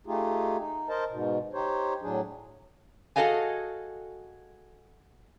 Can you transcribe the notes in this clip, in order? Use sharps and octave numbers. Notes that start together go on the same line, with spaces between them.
A3 D#4 F4 G4 G#4
D#4
A#4 C5 D#5 A5
G#2 B2
D#4 G4 C5 C#5
A2 F#3 D4 G#4
F#4 G#4 A4 D#5 F5 G#5